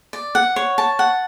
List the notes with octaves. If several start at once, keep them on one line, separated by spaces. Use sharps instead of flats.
D5
F#5
C#5
A5
F#5